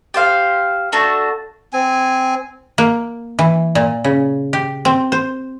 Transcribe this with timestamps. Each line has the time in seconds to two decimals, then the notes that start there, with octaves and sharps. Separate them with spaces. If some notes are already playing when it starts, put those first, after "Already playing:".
0.14 G4 C5 F5
0.92 A3 D4 F#4 A5
1.73 C4 G#5
2.78 A#3
3.39 E3
3.75 A#2
4.04 C#3
4.53 G4
4.85 C4
5.12 C5